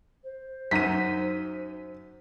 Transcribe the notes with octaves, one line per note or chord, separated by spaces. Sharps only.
C5
F#2 D#4 E5 B6 D#7